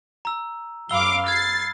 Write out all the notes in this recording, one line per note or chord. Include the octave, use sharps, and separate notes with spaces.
A#5 E6
F#2 F5 B5 D6 E6 G7
F6 G#6 A6 C7